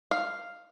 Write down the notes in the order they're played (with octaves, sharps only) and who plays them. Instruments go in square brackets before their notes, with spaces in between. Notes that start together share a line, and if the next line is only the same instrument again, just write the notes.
[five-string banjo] F5